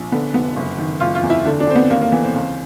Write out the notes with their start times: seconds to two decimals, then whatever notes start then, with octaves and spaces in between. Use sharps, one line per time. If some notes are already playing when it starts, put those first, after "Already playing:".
Already playing: A#1
0.12 D3 B3
0.34 F1 B3
0.56 F#1
0.78 D#3
1.00 F#1 F4
1.15 F4
1.23 E2
1.30 E4
1.45 D3
1.60 D4
1.67 D3 C4
1.75 B3
1.90 D#2 A#3
2.01 A#3
2.12 E3 B3
2.24 C4
2.34 C#2